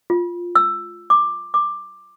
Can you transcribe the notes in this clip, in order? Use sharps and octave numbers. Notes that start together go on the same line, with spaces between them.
F4
E6
D6
D6